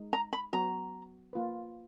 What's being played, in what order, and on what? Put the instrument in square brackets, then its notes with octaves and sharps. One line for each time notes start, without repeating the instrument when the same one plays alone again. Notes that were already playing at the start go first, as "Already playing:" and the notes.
Already playing: [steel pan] G#3 D#4
[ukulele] A#5
B5
[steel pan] F#3 B3 F#4 [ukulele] A#5
[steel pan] A#3 F4 B4